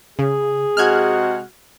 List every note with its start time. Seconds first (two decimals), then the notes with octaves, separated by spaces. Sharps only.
0.19 C#3 G#4
0.77 C3 G#3 F#4 F6 F#6 G#6